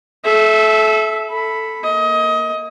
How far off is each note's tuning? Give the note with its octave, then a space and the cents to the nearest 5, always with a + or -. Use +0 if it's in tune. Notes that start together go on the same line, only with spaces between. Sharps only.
A4 -30 E5 +0
A4 +0 B5 +0
A#3 +0 D#5 +25